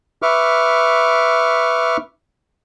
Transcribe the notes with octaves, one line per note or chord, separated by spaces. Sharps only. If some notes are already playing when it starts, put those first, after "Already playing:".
B4 E5 C#6 D6 F6